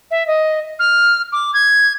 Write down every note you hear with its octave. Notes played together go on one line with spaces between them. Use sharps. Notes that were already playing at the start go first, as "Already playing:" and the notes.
E5
D#5
F6
D6
G#6